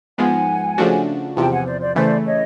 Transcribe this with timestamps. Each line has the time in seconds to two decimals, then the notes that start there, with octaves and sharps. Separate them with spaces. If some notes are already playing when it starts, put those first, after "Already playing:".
0.18 G#2 F3 G#3 B3 F#5 G#5
0.78 C#3 F3 A3 D4 F#4
1.36 E2 C3 F3 G5 A5
1.51 F#5 G#5
1.66 C5 D5
1.81 C5 D5
1.95 C#3 E3 A3 C5 D5
2.26 C#5 D#5